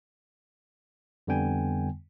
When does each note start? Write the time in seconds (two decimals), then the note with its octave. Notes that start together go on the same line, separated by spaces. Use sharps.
1.27 F2 D3 G3 B3 G5 G#5